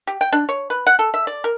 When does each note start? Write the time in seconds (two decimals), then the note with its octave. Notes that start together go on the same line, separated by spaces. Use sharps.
0.07 G4
0.21 G5
0.33 D4
0.49 C#5
0.70 B4
0.87 F#5
0.99 A4
1.14 E5
1.27 D5
1.44 A#4